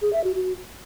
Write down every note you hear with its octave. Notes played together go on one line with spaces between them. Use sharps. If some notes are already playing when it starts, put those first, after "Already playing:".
G#4
E5
F#4
F#4